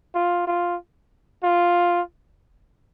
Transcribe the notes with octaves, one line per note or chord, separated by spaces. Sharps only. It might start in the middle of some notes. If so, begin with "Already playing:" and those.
F4
F4
F4